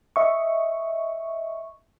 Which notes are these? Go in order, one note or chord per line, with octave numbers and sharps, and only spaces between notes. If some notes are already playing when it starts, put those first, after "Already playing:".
D#5 E5 C#6